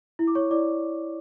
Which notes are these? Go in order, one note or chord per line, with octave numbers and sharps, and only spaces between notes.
E4
D6
E4 C#5 C#6
E4 D5 D6